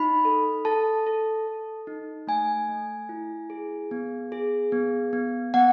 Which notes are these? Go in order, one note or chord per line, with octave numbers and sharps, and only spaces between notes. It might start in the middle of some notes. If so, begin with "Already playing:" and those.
Already playing: D#4 B5
A4
A4 A5
A4
A4
D#4
A3 G#5
A3
E4
G#4
B3
G#4
B3
B3
B3 F#5